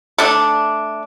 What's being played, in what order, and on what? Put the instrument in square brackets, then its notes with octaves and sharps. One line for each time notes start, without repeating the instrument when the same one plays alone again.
[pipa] A3 D4